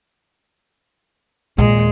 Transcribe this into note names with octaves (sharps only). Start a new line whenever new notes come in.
D#2 A#2 G#3